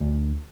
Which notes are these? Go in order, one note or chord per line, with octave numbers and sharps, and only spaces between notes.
D2